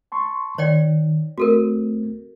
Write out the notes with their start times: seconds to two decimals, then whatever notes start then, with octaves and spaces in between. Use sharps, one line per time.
0.12 A5 C6 C#6
0.58 D#3 C#5 D5 G5
1.38 C2 A3 C4 F#4 A4 A#4